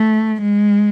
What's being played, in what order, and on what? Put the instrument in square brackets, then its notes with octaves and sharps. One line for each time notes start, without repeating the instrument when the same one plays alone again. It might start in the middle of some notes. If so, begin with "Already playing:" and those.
Already playing: [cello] A3
G#3